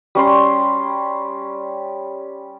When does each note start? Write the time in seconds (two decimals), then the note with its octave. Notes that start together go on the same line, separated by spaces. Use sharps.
0.15 G3 C#4 C6